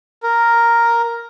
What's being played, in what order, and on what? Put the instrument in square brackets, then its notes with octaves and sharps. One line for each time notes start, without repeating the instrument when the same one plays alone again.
[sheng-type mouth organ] A#4